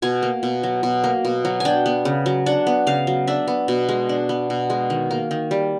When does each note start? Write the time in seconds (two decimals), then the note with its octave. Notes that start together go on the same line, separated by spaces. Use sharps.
0.02 B2 G#5
0.23 A#3
0.43 B2
0.63 F#3
0.83 B2
1.04 A#3
1.25 B2
1.45 F#3
1.60 D4 G5 G#5
1.86 B3
2.05 C#3
2.26 F#3
2.46 D4 F#5
2.67 B3
2.87 C#3 F5
3.07 F#3
3.27 D4 E5
3.48 B3
3.68 B2
3.89 G#3
4.09 D4
4.29 B3
4.50 B2
4.70 G#3
4.90 D#3
5.11 A#3
5.31 D#3
5.51 G3